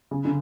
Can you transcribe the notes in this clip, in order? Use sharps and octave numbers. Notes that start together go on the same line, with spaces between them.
C#3
D3